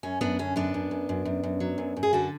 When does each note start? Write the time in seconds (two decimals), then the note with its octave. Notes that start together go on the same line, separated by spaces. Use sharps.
0.03 F#2 C#4
0.21 F#2 B3 D4
0.39 D3 C#4
0.56 F#2 B3 D4
0.74 F#2
0.91 F#2
1.09 F#2
1.25 F#2
1.43 F#2
1.60 F#3
1.78 F#2
1.96 F#2
2.03 G#4
2.13 D3 F#4 A4